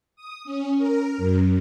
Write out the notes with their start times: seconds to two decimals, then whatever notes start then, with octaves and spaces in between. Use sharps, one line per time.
0.16 D#6
0.45 C#4
0.78 A#4
1.18 F#2